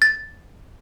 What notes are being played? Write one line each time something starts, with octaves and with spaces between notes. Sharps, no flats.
A6